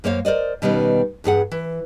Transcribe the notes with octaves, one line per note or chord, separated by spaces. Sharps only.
F#2 A#3 C5 C#5 F5
A#4 C5 D5 D#5
B2 D#3 G3 B3 C#4
E2 G2 G#4 F#5
E3